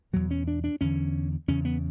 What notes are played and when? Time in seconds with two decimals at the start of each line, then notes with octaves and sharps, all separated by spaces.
0.13 E2 B2 F#3
0.31 C#4
0.48 D4
0.64 D4
0.81 E2 D3 C#4
1.48 E2 C#3 C#4
1.65 B3